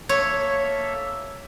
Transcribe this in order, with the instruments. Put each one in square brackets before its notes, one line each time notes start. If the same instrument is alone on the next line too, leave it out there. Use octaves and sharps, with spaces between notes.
[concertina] A#3 A4 E5 [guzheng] C#5